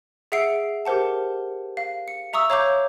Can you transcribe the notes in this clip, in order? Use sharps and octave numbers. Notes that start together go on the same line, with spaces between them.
G#4 E5 F#5 E6 C7 D7
G4 A#4 C5 F#5 A5
F5
C#7
E5 A#5 C#6 D#6 E6
C#5 F5 A#5 C#6 D6 G6